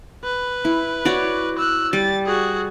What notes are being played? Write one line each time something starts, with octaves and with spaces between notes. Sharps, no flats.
B4
E4
F#4 C#5 D5
E6 F#6
G3 A6
F#4 G#4